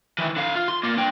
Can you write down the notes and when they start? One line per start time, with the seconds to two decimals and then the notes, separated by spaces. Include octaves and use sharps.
0.18 D#3 E3
0.36 D3 F5
0.55 F4
0.68 C6
0.83 A#3 F4
0.97 D4 G5